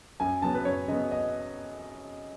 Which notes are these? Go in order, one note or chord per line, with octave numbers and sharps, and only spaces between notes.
F#2 G#5
C#3 F#3 B3 A5
B4
F#2 C#5
C#3 F#3 B3 D#5
D#5